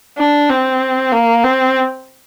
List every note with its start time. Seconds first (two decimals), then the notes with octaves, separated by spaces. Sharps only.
0.18 D4
0.50 C4
1.12 A#3
1.44 C4